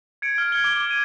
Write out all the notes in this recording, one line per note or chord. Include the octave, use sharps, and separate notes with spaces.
G#6 C#7 D7
F6
G#6 G7
D6 G7
G#6 D#7